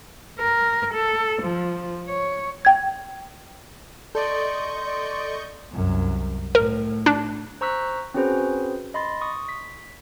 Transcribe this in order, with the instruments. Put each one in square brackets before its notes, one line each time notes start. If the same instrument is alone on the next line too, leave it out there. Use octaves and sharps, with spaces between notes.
[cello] A#4
A4
F3
C#5
[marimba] G5 G#6
[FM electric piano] A4 [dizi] D5 [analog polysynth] D#5 C#6 G6 [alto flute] C6
[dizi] D5
[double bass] C2 F#2
[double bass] A2 [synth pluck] A#4
[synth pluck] D4
[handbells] C5 A#5 C#6 E6 F#6 B6
C4 C#4 F#4 G#4 B4 C5
D#5 B5 C6 A6
C#6 D#6
B6